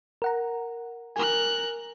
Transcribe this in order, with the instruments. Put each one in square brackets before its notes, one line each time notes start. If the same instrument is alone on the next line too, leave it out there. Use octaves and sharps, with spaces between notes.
[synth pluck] A#4 F#5 A#5
[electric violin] A#4 F#6 [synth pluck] G#5